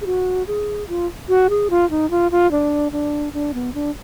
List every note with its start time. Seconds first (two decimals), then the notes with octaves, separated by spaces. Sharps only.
0.01 G#4
0.06 F#4
0.47 G#4
0.89 F4
1.29 F#4
1.50 G#4
1.70 F4
1.90 D#4
2.11 F4
2.31 F4
2.52 D4
2.92 D4
3.33 D4
3.54 B3
3.74 D4